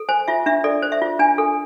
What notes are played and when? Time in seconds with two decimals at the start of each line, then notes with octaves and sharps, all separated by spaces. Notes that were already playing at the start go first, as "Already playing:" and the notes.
Already playing: A4
0.09 C5 G#5
0.28 F4 E5
0.46 D4 E5
0.64 A4 D5
0.82 C5
0.92 E5
1.02 F4
1.19 D4 G#5
1.38 A4